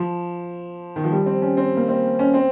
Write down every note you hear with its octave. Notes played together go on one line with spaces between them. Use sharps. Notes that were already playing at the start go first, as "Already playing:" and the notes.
Already playing: F3
D#3
F3
G3
C4
C#4
C4
A#3
C4
C#4
C4